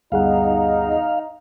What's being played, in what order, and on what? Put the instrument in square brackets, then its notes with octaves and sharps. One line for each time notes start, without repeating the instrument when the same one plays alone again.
[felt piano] G1 G2 [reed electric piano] D2 G#4 F#5 [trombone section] D#4 [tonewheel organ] F5